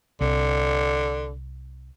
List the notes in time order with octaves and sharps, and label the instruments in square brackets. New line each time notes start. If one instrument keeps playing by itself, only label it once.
[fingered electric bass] C2 [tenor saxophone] D3